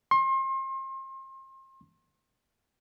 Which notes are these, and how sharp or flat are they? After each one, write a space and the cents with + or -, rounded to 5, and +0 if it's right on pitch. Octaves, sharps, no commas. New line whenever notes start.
C6 +35